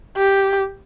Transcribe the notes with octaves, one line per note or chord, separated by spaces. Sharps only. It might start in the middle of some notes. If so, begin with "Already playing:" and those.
G4